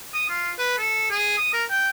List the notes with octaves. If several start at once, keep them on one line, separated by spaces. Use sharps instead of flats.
D#6
F4
B4
A4
G#4
D#6
A#4
G5